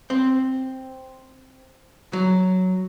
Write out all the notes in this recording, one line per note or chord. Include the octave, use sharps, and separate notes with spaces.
C4
F#3